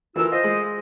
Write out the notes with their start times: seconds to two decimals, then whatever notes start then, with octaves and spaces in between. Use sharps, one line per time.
0.16 D2 E3 F4 A#4 E6
0.32 F4 C5 D#5
0.44 G#3